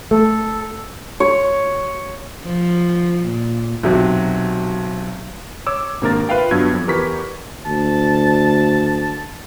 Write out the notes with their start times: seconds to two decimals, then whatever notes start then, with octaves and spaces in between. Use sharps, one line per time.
0.11 A3 A4
1.20 C#5
2.44 F3
3.26 A#2
3.83 B1 C3 F#3
5.67 C#5 D6 E6
6.01 G#1 C3 A#3 D4 A#4 A6
6.29 F4 B4 E5 F5 G5
6.51 G2 F#3 B3 E6 G#6
6.73 F2
6.87 E2 G4 A#4 B4 C#6 B6
7.65 D2 A5